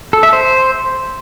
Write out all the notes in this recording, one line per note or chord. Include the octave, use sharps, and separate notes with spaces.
A4
E5
C5